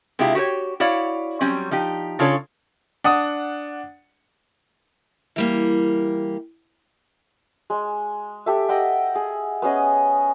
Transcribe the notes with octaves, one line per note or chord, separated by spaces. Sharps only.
C3 G#3 D4 E4 F4 G4
F#4 G4 B4 C#5
E4 F#4 C#5 D5 F5
F#3 G3 C4 C#4
F3 D#4 G4
C#3 D4 F4 A4 C#5 D5
D4 F#5 D#6
E3 G3 A#3
G#3
G4 A4 E5
D#5 E5 F#5 G5
G#4
B3 C#4 G#4 D#5